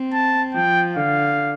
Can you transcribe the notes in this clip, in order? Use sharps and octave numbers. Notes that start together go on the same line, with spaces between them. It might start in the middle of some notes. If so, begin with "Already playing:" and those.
Already playing: C4
A5
F3 G5
D3 F5